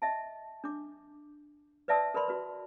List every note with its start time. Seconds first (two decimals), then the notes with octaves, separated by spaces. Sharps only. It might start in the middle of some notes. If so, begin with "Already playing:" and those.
0.02 D#5 E5 A5
0.64 D4 D6
1.88 B4 D5 E5 A5 D#6 E6
2.14 A#4 B4 D5 B5 C6
2.28 F#4 B4